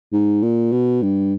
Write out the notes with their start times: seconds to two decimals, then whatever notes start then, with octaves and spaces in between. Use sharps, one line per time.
0.12 G#2
0.42 A#2
0.72 B2
1.02 G2